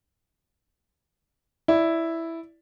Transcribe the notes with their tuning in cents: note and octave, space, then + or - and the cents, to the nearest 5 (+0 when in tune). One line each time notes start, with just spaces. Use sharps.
E4 +0 D5 +0